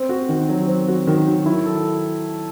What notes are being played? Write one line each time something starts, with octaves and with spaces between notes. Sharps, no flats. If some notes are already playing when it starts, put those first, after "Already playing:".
Already playing: C4
F#4
D#3
F#3
C4
F#4
D#3
F#3
E4
A4